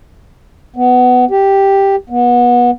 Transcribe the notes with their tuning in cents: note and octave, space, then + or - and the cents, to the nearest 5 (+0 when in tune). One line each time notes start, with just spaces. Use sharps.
B3 +15
G4 +0
B3 -25